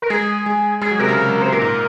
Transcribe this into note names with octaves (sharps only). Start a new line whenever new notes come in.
A#4
G#3 G#4
G#3
G#3 G#4
F#3
C3 A#4
C#3
G#3
F#3
C3 C5
A#2 A#4
G#2